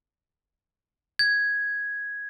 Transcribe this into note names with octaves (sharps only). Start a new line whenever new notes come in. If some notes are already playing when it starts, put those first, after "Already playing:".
G#6